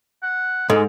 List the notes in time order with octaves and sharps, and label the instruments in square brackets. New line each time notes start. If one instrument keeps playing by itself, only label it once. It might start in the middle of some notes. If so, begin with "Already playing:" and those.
[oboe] F#5
[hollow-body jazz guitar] G#2 [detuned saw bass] G#3 [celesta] A4 [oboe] D#6